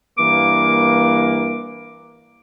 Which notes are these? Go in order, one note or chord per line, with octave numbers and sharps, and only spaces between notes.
G2 E3 A#3 D6